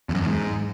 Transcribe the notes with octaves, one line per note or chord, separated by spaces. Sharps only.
E2
F#2
E2
G#2